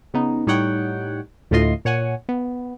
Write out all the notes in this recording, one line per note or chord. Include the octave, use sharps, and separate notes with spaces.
C#3 B3 D#4
A2 G3 D#4 C#5 F#5 G5
D2 A2 A3 F4 D#5 C6
A#2 C#5 F#5 G#5
B3